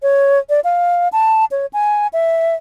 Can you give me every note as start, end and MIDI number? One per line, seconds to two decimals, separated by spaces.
0.02 0.39 73
0.49 0.60 74
0.64 1.08 77
1.12 1.45 81
1.51 1.66 73
1.73 2.07 80
2.13 2.55 76